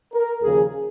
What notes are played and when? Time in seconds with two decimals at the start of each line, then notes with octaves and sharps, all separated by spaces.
0.13 A#4
0.42 D#2 C#3 F3 G#4